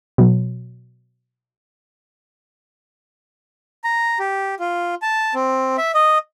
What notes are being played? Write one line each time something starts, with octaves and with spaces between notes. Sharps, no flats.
B2 F#3
A#5
G4
F4
A5
C4
E5
D#5